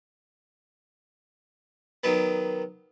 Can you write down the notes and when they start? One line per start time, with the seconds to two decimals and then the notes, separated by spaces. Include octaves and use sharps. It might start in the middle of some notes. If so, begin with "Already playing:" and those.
2.04 D#3 F#3 B3